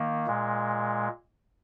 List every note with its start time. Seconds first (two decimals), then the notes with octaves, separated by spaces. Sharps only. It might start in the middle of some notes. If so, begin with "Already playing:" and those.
Already playing: D#3 A#3
0.27 A#2 G#3